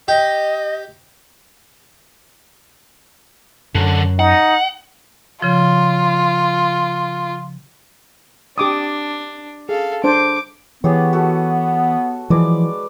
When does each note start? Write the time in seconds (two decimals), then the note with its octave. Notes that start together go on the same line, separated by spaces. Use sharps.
0.08 G4 D#5
3.75 F#2 D3
4.19 D#4 F#5
5.42 C#3 F3 F4
8.58 D4 G4 D6 D#6
9.69 G#4 A4 F5
10.04 D4 C5 A5 D6
10.84 E3 B3 G4 G#4 C#5
11.13 F#4 A4
12.30 E3 F3 G#3 B4 D5